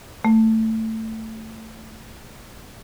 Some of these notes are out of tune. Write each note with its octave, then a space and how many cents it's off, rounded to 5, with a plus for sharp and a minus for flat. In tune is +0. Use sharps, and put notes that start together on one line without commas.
A3 +15